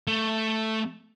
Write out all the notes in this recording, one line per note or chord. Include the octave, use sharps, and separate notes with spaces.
A3